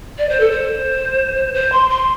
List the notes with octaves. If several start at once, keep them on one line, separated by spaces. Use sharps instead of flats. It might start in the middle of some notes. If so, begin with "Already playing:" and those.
D5
C5
A4
C5
C5
C6
C6